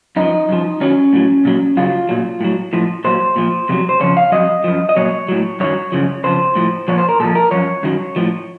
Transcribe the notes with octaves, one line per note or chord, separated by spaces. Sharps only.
F#2 F3 D#4
F#2 F3
F#2 D#3 F#3 C#4
A2 F#3
A#2 F#3
F#2 C#3 F#3 F4
A#2 F#3
A2 F#3
A2 F3
A#2 F#3 C5
A#2 F3
F2 C3 F#3
C5
F2 C#3 F3 C#5
F5
F2 C3 F#3 D#5
F#2 F3
D#5
A#2 F#3 C#5
A2 F#3
F#2 D#3 F#3 C#5
F#2 C#3 F3
F2 C#3 F3 C5
A2 F3
A#2 F3 C#5
C5
A#4
A#2 F3 A4
A#4
F#2 C#3 F3 C#5
F#2 D#3 F#3
A2 F3